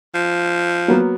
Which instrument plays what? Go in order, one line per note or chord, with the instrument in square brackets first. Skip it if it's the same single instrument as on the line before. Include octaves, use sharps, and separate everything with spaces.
[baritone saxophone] F3
[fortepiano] F#3 A#3 B3